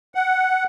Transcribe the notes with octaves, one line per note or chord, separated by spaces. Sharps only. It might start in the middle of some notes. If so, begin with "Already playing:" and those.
F#5